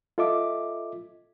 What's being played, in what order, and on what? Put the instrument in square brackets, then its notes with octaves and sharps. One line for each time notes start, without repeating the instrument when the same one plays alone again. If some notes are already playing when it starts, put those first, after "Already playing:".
[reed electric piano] F4 A4 D#5 E5 D6